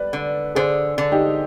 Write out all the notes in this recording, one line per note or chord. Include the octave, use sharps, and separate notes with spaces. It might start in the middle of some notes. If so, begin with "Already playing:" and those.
Already playing: G3 B4 D5
D3
D3 G#4 C5
D3
D#4 G4